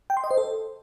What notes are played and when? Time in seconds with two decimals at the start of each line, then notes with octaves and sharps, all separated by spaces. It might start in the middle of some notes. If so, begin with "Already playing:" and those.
0.10 G5
0.17 C6
0.24 D#5
0.31 C5
0.38 A4